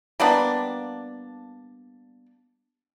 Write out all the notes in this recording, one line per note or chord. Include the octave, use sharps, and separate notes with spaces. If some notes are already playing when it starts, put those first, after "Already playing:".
G3 A#3 B3 D4